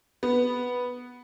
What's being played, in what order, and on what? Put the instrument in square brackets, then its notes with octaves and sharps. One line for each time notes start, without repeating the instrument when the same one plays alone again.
[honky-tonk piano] B3